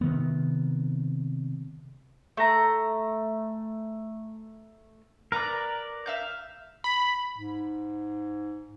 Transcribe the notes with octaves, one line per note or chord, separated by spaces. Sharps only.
C3 D#3 B3
A3 A#5
A#4 B4 D5 A#5
E5 F5 G6
B5
G#2